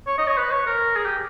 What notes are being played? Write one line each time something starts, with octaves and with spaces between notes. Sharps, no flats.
C#5
D#5
C#5
B4
C#5
A#4
G#4
G4